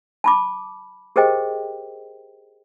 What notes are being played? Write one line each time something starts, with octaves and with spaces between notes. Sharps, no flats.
A5 B5 D6
G4 G#4 A#4 C5 D#5 G5